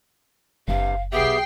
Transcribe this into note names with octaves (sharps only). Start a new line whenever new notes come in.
F#1 G2 C3 F5
B1 B3 G4 G#4 E5 G5 C7